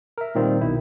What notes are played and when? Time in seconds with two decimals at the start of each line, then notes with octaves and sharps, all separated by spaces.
0.18 A#4 E5
0.35 A#2 D#3 G3 C4 F4
0.61 B1 B2 D#3 E4